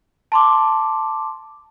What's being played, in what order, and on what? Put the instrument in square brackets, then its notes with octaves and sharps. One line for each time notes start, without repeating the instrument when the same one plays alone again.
[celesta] A5 C6 D6